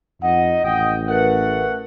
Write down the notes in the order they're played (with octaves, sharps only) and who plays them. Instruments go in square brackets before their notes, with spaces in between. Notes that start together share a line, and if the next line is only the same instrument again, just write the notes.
[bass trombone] F2 [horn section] D#4 D#5 [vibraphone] F#5
[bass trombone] A1 [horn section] D#5 G5
[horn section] A3 F#5 [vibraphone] A#4 B4